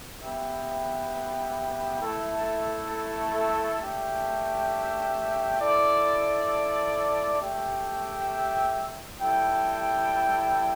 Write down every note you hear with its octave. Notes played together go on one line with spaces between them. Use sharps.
B3 G4 B4 E5 G5
A3 E4 A4
A3 D4 G4 E5 G5
E4 A4 D5
A3 G4 E5 G5
G3 E4 A4 G5